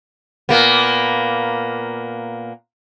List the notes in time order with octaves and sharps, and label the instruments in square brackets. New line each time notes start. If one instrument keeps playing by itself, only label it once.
[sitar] A#2 A#3 B3